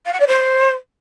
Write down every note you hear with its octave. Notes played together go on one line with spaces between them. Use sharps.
F5
F#5
D5
C5